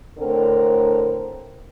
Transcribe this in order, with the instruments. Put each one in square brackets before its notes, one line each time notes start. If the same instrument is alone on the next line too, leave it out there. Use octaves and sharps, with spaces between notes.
[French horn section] A2 D3 C4 A#4